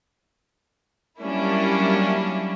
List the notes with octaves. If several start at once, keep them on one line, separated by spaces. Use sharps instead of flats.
F#3 G3 A#3 C#4 D4 E4